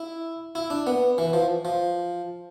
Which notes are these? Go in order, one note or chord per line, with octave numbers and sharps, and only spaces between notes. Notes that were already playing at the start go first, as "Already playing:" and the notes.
Already playing: E4
E4
D4
B3
E3
F3
F3